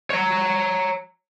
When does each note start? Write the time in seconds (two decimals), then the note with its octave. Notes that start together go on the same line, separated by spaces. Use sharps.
0.10 C#5 A#5